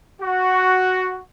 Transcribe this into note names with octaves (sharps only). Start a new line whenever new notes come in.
F#4